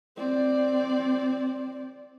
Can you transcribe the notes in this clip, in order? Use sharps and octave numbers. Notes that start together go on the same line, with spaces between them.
C4 D5